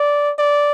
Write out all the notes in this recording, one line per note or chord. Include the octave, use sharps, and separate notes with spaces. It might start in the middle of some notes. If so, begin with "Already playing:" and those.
Already playing: D5
D5